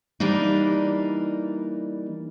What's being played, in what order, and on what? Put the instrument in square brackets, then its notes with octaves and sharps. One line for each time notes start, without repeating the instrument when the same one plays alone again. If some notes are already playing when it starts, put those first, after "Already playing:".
[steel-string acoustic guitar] E3 G3 A#3 D4 D#4